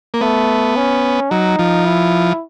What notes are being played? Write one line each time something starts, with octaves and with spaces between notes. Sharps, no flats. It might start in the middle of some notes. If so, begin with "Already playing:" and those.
A#3
A3 B3
C#4
F#3 D#4
F3
E4